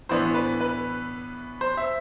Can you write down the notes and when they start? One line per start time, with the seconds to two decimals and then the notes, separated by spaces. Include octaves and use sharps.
0.09 A2 E3 B3 D4 C5
0.34 B4
0.61 B4
1.61 C5
1.77 E5